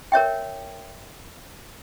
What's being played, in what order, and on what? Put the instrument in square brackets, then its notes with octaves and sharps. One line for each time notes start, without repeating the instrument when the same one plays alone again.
[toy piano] A#4 C#5 E5 G5